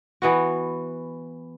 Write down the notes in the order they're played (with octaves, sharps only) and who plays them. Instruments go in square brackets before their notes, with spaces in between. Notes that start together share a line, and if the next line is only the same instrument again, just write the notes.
[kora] E3 B3 F#4